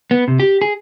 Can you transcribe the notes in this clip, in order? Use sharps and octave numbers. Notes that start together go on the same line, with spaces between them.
B3
C3
G4
G#4